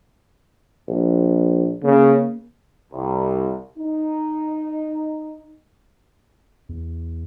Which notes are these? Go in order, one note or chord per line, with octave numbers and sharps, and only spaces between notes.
A#1
C#3 A#3
C2
D#4
E2